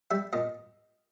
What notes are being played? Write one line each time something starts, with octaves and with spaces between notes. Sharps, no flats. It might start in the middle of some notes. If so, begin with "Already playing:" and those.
G3 E5
A#2 D#5